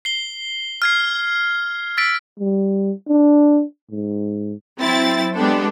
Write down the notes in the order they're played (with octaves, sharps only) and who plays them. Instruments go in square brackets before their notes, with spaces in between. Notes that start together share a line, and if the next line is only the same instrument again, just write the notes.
[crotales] C7 G7
F6 G#6 C7
E6 A6 B6 D7
[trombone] G3
D4
G#2
[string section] F#3 C4 E4 A6
G#3 B3 D4 G4 A4